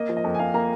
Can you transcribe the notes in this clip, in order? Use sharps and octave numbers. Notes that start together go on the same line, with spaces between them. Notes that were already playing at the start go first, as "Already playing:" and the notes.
Already playing: A#3 D#5
F3
D#5
F2
G#5
F2 F5
A#3 A#5